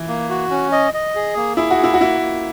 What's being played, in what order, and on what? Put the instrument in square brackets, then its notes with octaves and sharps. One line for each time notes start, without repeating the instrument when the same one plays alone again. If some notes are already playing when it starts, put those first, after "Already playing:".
Already playing: [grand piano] E3
[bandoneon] A#3
F#4
C#4
D#5
D#5
G#4
A#3
[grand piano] E4 [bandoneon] G#4
[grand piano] F#4
[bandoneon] A#3 [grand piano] E4
[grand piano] F#4
[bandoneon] A#3 [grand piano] E4
[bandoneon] A#3